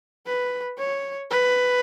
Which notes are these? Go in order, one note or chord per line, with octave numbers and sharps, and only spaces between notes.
B4
C#5
B4